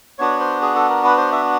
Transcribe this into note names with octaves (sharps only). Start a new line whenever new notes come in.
B3 D4 F#4 C#5
C5
G#4
A4
A#4
B4
C5
E5